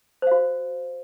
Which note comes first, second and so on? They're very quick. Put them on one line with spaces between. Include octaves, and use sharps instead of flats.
C5 F5 F#4